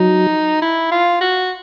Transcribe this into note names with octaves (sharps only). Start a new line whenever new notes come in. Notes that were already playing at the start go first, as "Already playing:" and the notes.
Already playing: F#3 D#4
E4
F4
F#4